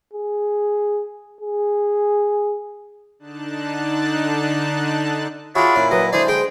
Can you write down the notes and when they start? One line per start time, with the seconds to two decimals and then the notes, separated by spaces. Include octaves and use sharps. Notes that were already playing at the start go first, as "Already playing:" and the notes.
0.14 G#4
1.41 G#4
3.19 D3 D4 D#4 A5 F#6
5.55 D4 F4 F#4 G#4 C#5 E5 B5
5.76 A#2 C#4 E4
5.91 F#3 B4 D#5
6.13 D3 G#3 E4 G#4 C5 D5
6.28 G#4 G5